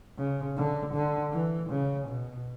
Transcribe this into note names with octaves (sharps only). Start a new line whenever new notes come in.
C#3
D3
D3
E3
C#3
B2